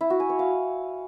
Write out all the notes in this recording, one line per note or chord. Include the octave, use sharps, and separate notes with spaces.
E4
F#4
G#5
C#5
F5